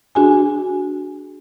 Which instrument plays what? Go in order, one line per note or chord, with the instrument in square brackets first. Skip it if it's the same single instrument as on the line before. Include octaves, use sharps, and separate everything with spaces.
[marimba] D4 F#4 G#4 G#5